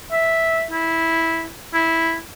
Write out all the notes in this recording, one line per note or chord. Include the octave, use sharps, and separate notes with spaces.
E5
E4
E4